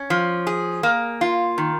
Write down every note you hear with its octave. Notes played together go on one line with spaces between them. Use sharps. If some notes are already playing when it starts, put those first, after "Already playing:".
Already playing: C#4
F3
G#4
A#3
F4
D#3